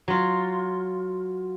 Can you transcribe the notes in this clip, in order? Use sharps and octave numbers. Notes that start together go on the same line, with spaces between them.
F#3 F4